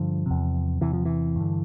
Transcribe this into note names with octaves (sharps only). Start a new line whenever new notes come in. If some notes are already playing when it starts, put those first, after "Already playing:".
Already playing: G2 D3 F3
E2 C3
E2 C3 E3
F3
E3
G2 D3